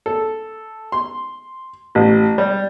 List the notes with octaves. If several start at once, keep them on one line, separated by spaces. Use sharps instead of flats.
A4
C6
A1
G3